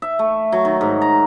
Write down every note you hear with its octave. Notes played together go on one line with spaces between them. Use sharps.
E5
A3
F#3
D#3
G#2
A#5